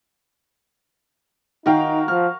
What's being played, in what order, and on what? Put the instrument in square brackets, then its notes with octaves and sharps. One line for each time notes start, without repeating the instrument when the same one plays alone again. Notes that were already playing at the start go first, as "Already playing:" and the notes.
[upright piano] D#3 G5 [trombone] D#4 [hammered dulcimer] F#4 A#4 F5
[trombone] F3 [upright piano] F6